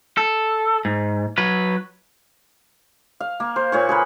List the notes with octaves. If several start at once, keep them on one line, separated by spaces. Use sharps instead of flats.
A4
G#2
F#3 B4
F5
A#3
C5
A#2 C#5 C#6
G#4 A#4 B4